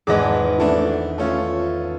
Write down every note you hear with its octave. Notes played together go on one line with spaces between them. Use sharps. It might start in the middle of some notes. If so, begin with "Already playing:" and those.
G#1 E2 G#3 G#4 B4 D#5 D6
E3 A3 D4
A3 C#4 F4